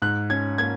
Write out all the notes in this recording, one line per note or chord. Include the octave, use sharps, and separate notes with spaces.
G#2 F#6
C#4 G#6
A#3 G#6